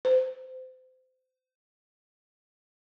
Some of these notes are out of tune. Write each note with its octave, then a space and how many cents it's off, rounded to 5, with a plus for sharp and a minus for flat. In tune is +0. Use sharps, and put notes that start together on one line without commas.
C5 -30